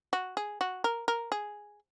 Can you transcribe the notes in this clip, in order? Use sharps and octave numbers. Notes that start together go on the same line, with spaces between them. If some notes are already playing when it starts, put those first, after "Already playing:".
F#4
G#4
F#4
A#4
A#4
G#4